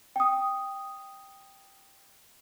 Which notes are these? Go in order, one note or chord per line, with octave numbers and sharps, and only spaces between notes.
G5 D#6